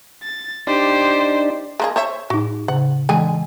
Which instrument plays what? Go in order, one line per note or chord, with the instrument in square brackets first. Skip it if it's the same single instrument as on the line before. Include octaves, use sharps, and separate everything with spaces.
[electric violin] A6
[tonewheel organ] D4 D#4 D5 [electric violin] G4 C5
[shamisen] G#3 A#3 G#4
C5 C#5 E5
[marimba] A2 D#4 [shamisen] F#4
[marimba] C#3 [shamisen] F#5
[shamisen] D3 G#4 G#5 [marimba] E3 G#3